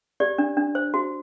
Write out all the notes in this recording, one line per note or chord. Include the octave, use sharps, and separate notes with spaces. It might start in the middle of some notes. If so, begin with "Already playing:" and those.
G4 D5
D4
D4
C5
F#4